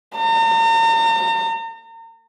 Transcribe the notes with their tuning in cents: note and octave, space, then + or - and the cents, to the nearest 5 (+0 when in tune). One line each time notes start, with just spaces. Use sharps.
A#5 -40